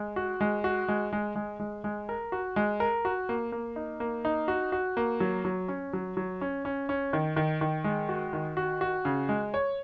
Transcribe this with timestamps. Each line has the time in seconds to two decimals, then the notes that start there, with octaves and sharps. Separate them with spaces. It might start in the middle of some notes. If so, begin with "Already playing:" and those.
Already playing: G#3
0.16 F#4
0.41 G#3
0.64 F#4
0.88 G#3
1.13 G#3
1.36 G#3
1.60 G#3
1.84 G#3
2.09 A#4
2.32 F#4
2.56 G#3
2.80 A#4
3.05 F#4
3.29 A#3
3.52 A#3
3.76 D#4
4.00 A#3
4.25 D#4
4.48 F#4
4.72 F#4
4.97 A#3
5.20 F#3
5.45 F#3
5.68 C#4
5.93 F#3
6.17 F#3
6.41 C#4
6.65 C#4
6.89 C#4
7.13 D#3
7.36 D#3
7.61 D#3
7.84 G#3
8.09 F#4
8.33 D#3
8.57 F#4
8.81 F#4
9.05 C#3
9.29 G#3
9.54 C#5